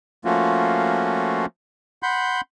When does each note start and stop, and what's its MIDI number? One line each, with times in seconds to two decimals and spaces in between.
0.25 1.46 53
0.25 1.46 57
0.25 1.46 58
0.25 1.46 61
0.25 1.46 65
0.25 1.46 66
2.03 2.41 78
2.03 2.41 83
2.03 2.41 84
2.03 2.41 91